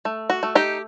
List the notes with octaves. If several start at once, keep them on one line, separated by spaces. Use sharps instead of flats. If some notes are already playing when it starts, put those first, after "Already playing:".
A3
F#4
A3
D#4 G4